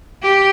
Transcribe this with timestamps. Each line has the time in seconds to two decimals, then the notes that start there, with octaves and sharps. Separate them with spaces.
0.23 G4